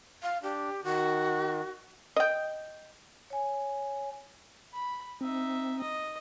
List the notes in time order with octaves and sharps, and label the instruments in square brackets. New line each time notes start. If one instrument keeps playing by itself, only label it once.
[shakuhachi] F5
[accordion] D4 [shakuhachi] G4
[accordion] D#3 [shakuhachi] F#4
[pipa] D#5 G5
[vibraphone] C#5 G#5
[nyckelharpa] B5
[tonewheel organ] C4 [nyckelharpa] D#4 E5
[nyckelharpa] D#5